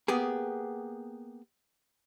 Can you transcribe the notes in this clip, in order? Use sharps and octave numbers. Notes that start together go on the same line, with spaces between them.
A#3 B3 G4 G#4